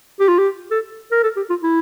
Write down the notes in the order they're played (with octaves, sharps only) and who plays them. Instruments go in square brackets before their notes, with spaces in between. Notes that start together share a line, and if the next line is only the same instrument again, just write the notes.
[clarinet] G4
F4
G4
A4
A#4
A4
G4
F4
E4